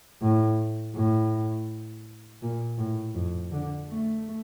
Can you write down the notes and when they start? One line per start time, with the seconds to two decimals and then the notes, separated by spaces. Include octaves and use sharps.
0.21 A2
0.95 A2
2.42 A#2
2.78 A2
3.14 F2
3.51 D3
3.88 A3